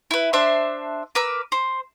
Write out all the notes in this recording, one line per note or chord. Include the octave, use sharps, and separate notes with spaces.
E4 B4
D4 C5 E5 C6
A#4 B4 D6 E6
C5